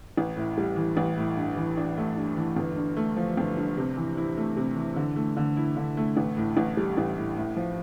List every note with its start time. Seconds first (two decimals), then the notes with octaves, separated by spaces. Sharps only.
0.17 A1
0.36 A2
0.58 G3
0.76 E3
0.97 A1
1.18 A2
1.37 G2
1.57 E3
1.77 D4
1.97 A3
2.16 G2
2.37 E3
2.56 G1
2.76 G2
2.97 A3
3.17 F3
3.37 G1
3.57 G2
3.77 C3
3.97 E3
4.17 E4
4.37 A3
4.56 C3
4.76 E3
4.96 D3
5.16 A3
5.37 D3
5.56 E4
5.77 D3
5.97 A3
6.17 A1
6.37 A2
6.57 A1
6.77 G3
6.97 A1
7.17 A2
7.36 A2
7.56 F3